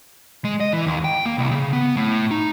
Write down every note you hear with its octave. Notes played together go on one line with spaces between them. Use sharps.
G#3
D#5
E3
D#2
G5
A#3
C2
C#3
B3
A2
D#4